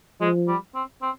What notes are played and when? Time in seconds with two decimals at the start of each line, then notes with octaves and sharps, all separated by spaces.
0.20 F3 G#3
0.48 G3
0.74 C4
1.02 C4